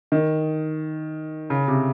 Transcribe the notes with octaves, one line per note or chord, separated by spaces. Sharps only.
D#3
C#3
C3